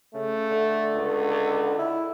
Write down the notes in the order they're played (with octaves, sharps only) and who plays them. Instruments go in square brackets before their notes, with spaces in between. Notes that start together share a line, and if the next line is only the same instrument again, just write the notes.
[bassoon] C#3 [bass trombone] A3
[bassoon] D3
[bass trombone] C#2
[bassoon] E4